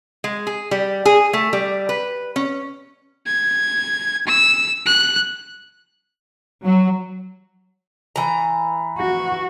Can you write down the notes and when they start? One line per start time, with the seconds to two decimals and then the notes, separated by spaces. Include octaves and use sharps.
0.24 G#3
0.47 G#4
0.71 G3
1.05 G#4
1.33 A3
1.53 G3
1.89 B4
2.36 C#4
3.26 G#6
4.27 E6
4.86 F#6
6.64 F#3
8.16 E3 A#5
8.98 F#4